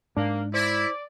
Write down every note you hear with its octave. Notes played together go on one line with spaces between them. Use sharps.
G#2 A#3 D4
E4 C5 D5